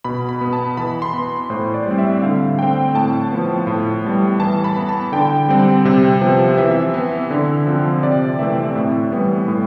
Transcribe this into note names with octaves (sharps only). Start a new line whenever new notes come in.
B2 B5
B5
B3
A5
E3 B5
C6
B3
A2 C5
D5
G3 C4
E5
D3 F5
A3 C4 G5
A2 A5
F3 B3
A2
G3 B3
E3 A5
B5
B3
A5
D3 G5
G3 C4
C3
F3 B3
E3 E5
B3
D3
F3 C4
C3 D5
E3 A3 C4 E5
A2
E3 G3 B3
A2